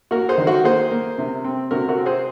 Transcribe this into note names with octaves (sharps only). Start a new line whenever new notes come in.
A#3 F#4 A#4
G#4 C5
D#3
F#4 A#4
A#3 G#4 C5
A#3
C3
C4
C3 F#4 A#4
F#4 A#4
C4
G#4 C5